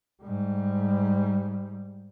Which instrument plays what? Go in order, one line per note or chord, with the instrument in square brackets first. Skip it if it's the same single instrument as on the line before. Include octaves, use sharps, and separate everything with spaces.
[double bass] G#2 G3